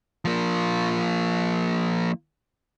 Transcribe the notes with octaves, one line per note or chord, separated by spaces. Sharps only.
F3 A#3